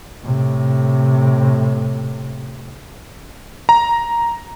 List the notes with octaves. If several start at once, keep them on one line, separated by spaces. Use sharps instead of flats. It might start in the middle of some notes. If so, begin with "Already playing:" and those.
A2 C3
A#5